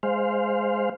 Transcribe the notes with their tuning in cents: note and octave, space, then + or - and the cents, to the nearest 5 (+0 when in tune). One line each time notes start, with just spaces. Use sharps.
G#3 +0 C5 -5 F5 +0